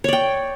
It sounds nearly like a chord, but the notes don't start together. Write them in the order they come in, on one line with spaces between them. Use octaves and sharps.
C#5 D5 G5